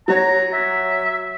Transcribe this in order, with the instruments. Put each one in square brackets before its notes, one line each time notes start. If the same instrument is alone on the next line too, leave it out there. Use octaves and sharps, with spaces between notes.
[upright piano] F#3 F#4 C#5 [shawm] A#5
[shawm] E5